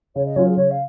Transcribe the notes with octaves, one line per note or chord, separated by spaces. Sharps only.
C#3 C#5
D#5
F#3 C#4 F4 C#5
G#4
C#3 C#5
F5